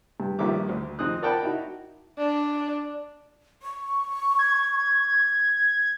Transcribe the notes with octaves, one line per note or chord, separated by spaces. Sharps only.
G2
A#1 G2 D#3 E5 D6
D2
F2 C4 D#4 D#6 F#6
A#4 D5 F#5 G5 A5 B5
D#4 E4 F#4
D4
C#6
G#6